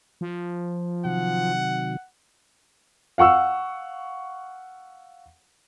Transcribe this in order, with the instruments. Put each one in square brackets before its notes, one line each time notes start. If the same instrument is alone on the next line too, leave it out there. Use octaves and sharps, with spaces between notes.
[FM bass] F3
[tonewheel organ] C3 D#3 F#3 [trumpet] F#5
[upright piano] F5 F#5 C#6 E6